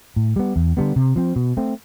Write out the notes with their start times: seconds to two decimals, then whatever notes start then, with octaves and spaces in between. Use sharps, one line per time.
0.16 A2
0.36 G3 B3
0.56 E2
0.77 D3 G3 B3
0.96 C3
1.16 F3 C4
1.36 B2
1.57 A3 C4